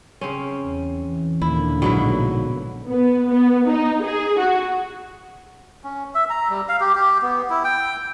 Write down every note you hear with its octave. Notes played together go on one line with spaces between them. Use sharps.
C#3 C4 C#4
E2
E3
D#2 A#2 D3 A#3 E4
A#1 G#2 B2 F#3 E4
B3
B3
D#4
G#4
F#4
C#4
E5
A#5
G3
F5
G4
G4
B3
E4
G5